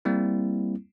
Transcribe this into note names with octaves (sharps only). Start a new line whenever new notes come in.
G3 A#3 C4 E4